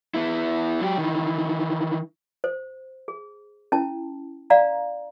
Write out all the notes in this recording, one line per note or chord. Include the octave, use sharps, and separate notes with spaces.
B3 E4
F#3 G4
D#3 E3
C5
G#4
C#4 E4 A5
D5 F5 F#5 A#5